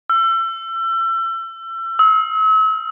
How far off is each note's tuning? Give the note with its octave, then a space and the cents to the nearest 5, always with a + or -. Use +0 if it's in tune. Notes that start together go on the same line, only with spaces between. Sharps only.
E6 +35
E6 -40